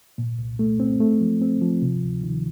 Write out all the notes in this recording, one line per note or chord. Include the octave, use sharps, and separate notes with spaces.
A#2
C2
A3
C4
A3
F3
C4
F3
C3
D2
D#3